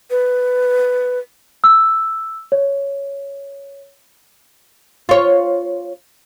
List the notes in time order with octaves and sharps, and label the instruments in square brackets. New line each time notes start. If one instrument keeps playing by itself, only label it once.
[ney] B4
[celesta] E6
C#5
[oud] F4 C#5